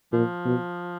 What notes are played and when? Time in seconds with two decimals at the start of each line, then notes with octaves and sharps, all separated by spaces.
0.12 A#2 F3
0.45 B2